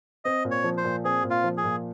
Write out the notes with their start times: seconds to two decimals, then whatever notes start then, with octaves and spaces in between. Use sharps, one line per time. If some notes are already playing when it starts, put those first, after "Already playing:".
0.25 C4 D#5
0.45 A#2
0.51 C#5
0.64 F3
0.78 C5
0.84 A#2
1.04 C4 G#4
1.24 A#2
1.30 F4
1.44 F3
1.58 G#4
1.64 A#2